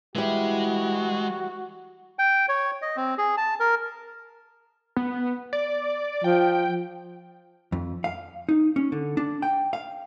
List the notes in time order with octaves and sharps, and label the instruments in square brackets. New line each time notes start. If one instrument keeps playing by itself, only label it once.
[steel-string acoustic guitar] E3 G3 [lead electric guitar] G#3 [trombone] F#4
[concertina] G5
C#5
D#5
C4
G#4
A5
A#4
[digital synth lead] B3
D5
[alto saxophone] F3 [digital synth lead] G5
[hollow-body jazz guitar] F2
F5
D#4
C#4
D3
D4
G5
F5